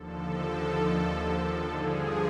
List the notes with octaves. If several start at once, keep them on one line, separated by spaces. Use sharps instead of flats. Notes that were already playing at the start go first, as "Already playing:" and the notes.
Already playing: D#2 D3 F3 A4
G2 D3 F3 G#4